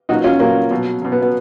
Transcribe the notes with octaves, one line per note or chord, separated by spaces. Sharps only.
A#2 F#3 D#4 F#4
C#4 F4
A#2 F#3 A#3 C#4
B2 F#3
B2 F#3
B3
B3